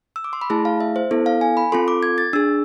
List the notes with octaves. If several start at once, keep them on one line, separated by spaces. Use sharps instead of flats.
E6
D6
C6
B5
A3 E4 G#4 A5
F5
E5
C5
B3 E4 A4
F5
G#5
B5
C4 F4 A4 C6
D6
G#6
A6
D4 G#4 E6